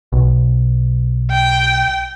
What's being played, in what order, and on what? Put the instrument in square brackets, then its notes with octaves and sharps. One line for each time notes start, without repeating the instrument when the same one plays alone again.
[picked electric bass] B1
[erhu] G5